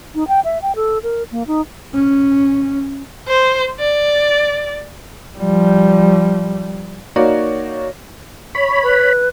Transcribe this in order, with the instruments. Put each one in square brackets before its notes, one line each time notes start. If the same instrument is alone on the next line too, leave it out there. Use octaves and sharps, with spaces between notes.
[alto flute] D#4
G5
E5
G5
A4
A#4
A#3
D#4
[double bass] C#4
[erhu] C5
D5
[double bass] F3 G3
[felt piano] A#3 D#4 F#4 C#5 D5
[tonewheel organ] C#5 B5
[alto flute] B4